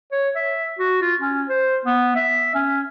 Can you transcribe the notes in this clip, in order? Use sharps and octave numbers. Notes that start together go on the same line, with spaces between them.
C#5
E5
F#4
F4
C#4
C5
B3
E5
C#4